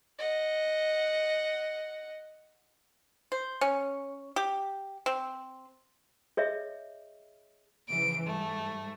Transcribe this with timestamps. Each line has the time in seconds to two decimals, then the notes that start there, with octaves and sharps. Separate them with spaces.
0.19 D#5 F#5
3.32 C5
3.61 C#4
4.36 G4
5.06 C4
6.37 G#4 C#5 D#5 E5
7.89 C#3 E3 F3 D7
8.26 G#2 G3 A3